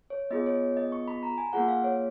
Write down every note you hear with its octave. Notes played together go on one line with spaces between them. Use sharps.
C#5
B3 F4 G#4 D#5
C#5
D#5
C#6
B5
A#5
G#5
A#3 F4 G#4 F#5
F5
C#5